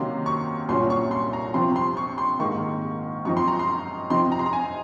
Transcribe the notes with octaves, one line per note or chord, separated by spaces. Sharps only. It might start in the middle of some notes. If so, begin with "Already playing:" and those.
Already playing: C3 D#3 F#3 A#3 C#4 C6
C#6
C2 A#2 F#3 C#4 C6
C#6
C6
A#5
C3 F3 C4 C6
C6
C#6
C6
G#2 D#3 A#3 C#6
F#2 F3 C4 D#4 C#6
C6
A#5
C6
C3 F3 C4 D#4 C6
A#5
C6
A#5
G#5